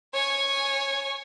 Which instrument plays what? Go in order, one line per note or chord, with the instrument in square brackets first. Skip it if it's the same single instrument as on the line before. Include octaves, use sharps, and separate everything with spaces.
[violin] C#5 G#5